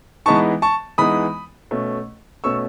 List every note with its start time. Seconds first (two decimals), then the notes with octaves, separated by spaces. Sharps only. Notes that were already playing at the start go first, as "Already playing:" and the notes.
0.26 E3 G#3 B3 D#4 A5 C#6
0.62 A5 C#6
0.98 E3 G#3 B3 D#4 B5 D#6
1.71 B2 A3 C#4
2.44 B2 A3 C#4 C#6 E6